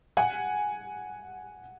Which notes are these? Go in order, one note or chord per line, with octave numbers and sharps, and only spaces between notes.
F#5 G#5